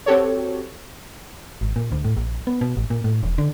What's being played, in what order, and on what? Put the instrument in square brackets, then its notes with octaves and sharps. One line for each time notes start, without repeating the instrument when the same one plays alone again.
[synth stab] C4 F#4 G4 A4 C#5
[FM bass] G#1
A#2
D2
A2
A#1
B3
B2
A1
A#2
A2
E1
D3